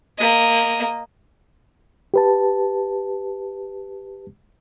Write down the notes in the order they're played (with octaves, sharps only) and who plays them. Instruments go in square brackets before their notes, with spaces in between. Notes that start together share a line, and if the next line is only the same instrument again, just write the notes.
[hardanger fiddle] A#3 D#5
[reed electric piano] G4 B4 A5